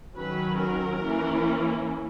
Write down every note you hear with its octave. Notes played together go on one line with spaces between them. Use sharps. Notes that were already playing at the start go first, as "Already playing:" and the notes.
D#3 F#3 C#4 B4
A#4
E3 A#3 C#4